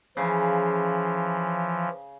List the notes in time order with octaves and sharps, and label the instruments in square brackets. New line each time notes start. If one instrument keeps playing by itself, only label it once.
[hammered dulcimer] C#3 [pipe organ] E3 F3